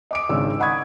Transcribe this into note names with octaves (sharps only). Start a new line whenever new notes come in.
D#5 D6 D7
G#1 C#3 G#3 C#4 D4 E6
D#5 F#5 B5 C#6 D#6 G#6